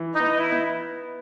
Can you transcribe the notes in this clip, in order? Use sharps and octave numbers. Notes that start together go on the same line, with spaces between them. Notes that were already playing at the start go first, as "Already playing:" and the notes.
Already playing: E3
D#4 D#5
B3
E4
B3